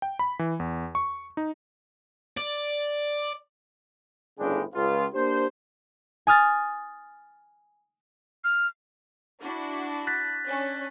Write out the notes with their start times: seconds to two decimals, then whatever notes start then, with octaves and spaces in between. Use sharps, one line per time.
0.02 G5
0.19 B5
0.39 E3
0.60 E2
0.95 C#6
1.37 D#4
2.37 D5
4.40 G1 A2 C#3 G#3 D4 G5
4.75 C#2 F4
5.14 A#3 D4 G4 C5
6.27 G#5 D#6 F6 A6
8.44 F6
9.41 D4 E4 F#4
10.07 F#6 A6 B6
10.45 C#4 D4